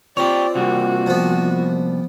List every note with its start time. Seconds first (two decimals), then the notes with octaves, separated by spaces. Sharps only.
0.17 C4 F4 G4 C#5 D5
0.55 C3 G3 A#3 F#4
1.06 F3 B3